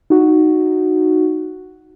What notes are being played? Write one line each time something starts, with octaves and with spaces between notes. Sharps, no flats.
D#4 F#4